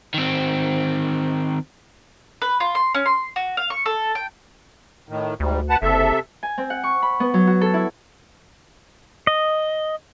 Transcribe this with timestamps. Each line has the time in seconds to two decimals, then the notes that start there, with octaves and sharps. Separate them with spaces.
0.14 D#3 C4
2.42 B4
2.60 F4
2.75 C6
2.95 C#4
3.06 C6
3.36 F#4
3.57 F5
3.70 C#6
3.86 A4
4.15 G5
5.09 A2 D#3
5.40 D2 G#2 G3
5.70 B4 F#5 A5
5.82 F#1 C3 A4 E5
6.43 G#5
6.58 C4
6.70 F#5
6.84 C#6
7.02 B5
7.20 B3
7.34 F#3
7.47 F#4
7.61 A4
7.74 E4
9.27 D#5